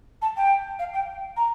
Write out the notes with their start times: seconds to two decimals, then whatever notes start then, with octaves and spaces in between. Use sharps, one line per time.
0.22 A5
0.37 G5
0.79 F5
0.93 G5
1.37 A#5